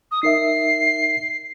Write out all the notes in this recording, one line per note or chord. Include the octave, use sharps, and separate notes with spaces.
D#6
D#4 A#4 E5 C7